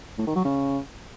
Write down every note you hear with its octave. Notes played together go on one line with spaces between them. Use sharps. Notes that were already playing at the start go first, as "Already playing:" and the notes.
A2
D#3
F#3
C#3